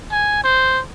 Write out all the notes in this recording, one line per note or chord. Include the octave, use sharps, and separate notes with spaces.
G#5
C5